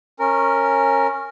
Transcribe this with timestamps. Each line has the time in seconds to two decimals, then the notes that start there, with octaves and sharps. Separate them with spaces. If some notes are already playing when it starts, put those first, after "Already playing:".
0.20 C#4 A#4